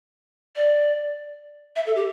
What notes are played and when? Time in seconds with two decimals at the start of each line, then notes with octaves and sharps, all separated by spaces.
0.56 D5
1.76 E5
1.86 A4
1.96 G4